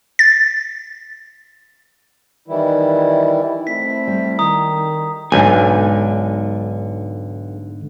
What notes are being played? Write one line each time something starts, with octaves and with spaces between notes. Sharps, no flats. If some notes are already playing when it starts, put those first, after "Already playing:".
A6
D#3 E3 G3 E4
A3 C4 E4 B6
G3
D#3 A#5 D#6
B1 G#2 D3 G#5